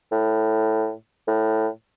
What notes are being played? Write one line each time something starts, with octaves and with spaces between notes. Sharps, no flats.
A2
A2